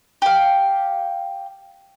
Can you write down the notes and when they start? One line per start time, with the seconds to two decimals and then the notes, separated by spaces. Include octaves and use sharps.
0.22 G4 F5